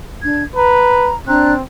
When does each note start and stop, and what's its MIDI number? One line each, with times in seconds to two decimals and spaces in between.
0.22 0.42 62
0.22 0.42 92
0.56 1.12 71
0.56 1.15 82
1.27 1.62 60
1.27 1.52 62
1.27 1.52 82
1.27 1.52 90